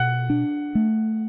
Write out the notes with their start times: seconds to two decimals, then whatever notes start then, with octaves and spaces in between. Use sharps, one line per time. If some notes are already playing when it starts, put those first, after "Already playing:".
Already playing: B2 F#5 F#6
0.30 D4
0.75 A3